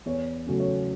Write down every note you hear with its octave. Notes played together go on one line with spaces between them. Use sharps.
E2 C#5
C#3 F#3 A3 C#4
C#5